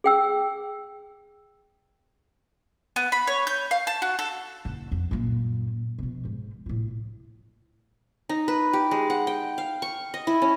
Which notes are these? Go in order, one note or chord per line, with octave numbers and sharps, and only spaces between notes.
G#4 G5 E6
B3
B5
C#5
G6
F5
A5
F#4
A4
F#1
F2
F#2 A#2
B2 F3
G#2
A2 F4
D#4
B4
G4
G#3
F#5
G5
F5
C#6
D#5
E4
C#4